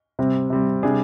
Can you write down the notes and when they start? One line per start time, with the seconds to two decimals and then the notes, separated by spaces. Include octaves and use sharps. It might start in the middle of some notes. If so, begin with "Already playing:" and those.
0.19 C3 G3 C4
0.50 C3 G3 C4
0.83 C3 G3 D4 G#4 D5